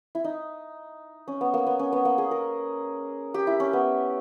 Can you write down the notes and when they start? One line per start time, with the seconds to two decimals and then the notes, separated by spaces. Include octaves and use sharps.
0.15 E4
0.24 D#4
1.28 C#4
1.41 B3
1.54 A#3
1.66 B3
1.79 C#4
1.92 B3
2.05 A#3
2.18 G#4
2.31 A#4
3.34 G4
3.47 E4
3.60 C#4
3.73 B3